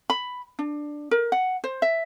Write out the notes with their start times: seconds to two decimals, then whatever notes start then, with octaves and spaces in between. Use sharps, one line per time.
0.10 B5
0.59 D4
1.11 A#4
1.32 F#5
1.64 C5
1.82 E5